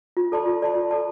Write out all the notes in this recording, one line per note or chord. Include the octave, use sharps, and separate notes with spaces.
F4
A4 D5 A5 C6
F4
A4 D5 A5 C6
F4
A4 D5 A5 C6